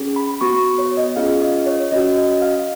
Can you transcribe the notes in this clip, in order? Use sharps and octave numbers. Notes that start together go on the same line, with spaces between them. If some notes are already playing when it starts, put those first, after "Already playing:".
Already playing: C#4 G#4
B5
B3 F#4 C#6
C#5
D#5
C#4 F4 G#4 F5
D#5
C#5
C#4 F#4 D#5
D#5
F5